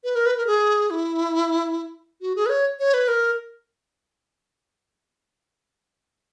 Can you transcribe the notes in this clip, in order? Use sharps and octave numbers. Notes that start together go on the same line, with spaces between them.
B4
A#4
B4
A#4
G#4
E4
F#4
G#4
B4
C#5
C#5
B4
A#4